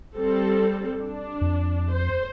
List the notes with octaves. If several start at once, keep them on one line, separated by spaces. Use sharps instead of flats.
G3 C4 A4
D4
F2
C5